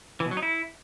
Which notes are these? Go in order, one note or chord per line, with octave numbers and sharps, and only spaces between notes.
E3
B2
F#3
D#4
E4